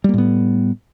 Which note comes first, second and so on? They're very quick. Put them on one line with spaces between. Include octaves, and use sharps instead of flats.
G3 A#3 A2 B3